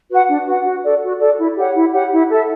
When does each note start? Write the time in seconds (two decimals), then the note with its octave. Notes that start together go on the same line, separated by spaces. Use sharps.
0.10 F#4 B4 F#5
0.27 D4
0.47 F#4 B4 F#5
0.64 F#4
0.83 A4 D5
1.02 F#4
1.20 A4 D5
1.37 E4
1.57 G4 C#5 F#5
1.75 E4
1.93 G4 C#5 F#5
2.12 E4
2.30 A4 E5